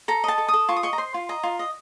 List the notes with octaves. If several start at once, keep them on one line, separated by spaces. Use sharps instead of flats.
A4 A#5
D#5 A5
A4
D#6
A4
F4 C#6
D#6
D#5 C#6
A#5
C5 C6
F4
D#5 A#5
F4
D#5